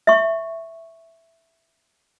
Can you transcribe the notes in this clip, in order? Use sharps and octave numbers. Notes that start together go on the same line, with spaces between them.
E5 C#6